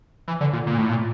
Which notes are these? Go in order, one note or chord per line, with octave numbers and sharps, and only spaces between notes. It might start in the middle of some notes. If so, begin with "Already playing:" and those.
E3
D3
A#2
A#2
A2
A#2